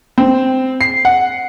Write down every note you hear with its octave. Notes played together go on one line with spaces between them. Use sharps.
C4
C7
F#5